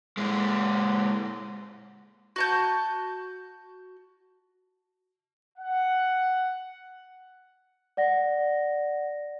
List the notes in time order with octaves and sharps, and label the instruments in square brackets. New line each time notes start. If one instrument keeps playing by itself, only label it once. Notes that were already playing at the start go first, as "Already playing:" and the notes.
[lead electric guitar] A#2 G#3
[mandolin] F#4 A5 G6
[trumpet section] F#5
[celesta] D5 F#5 A#6